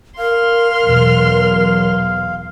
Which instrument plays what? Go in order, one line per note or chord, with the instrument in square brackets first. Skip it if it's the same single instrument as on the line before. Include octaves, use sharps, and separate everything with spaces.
[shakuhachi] A#4 [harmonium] F5 [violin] C6 F6
[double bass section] E2 B2 F#3